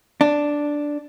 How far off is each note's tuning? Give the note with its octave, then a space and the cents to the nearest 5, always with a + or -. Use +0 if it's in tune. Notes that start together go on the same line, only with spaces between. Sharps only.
D4 +0